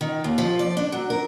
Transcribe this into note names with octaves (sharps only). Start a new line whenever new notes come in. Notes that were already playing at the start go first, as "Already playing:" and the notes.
D#3
D#2
F3
D5
D4
F#3
A#4